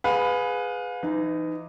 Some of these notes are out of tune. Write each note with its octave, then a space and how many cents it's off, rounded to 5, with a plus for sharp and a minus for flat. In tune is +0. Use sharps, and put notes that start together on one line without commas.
G#4 +0 B4 +5 F5 +35
E3 +30 D#4 +0